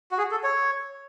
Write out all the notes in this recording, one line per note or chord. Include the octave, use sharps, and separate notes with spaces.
F#4
G#4
A4
C#5